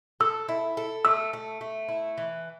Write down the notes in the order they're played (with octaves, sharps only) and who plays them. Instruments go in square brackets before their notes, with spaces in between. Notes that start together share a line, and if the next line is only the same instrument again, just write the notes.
[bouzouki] A4 [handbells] E6
[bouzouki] E4
A4
[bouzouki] A3 [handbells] E6
[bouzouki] A3
A3
E4
E3